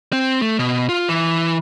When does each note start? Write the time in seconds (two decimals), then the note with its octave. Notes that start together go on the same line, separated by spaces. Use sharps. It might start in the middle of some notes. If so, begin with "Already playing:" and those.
0.13 C4
0.42 A3
0.59 B2
0.89 F4
1.09 E3